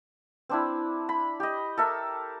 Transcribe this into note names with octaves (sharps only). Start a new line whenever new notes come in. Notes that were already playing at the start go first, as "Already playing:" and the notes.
C4 D4 E4
B5
G4 D#5
A4 A#4 E5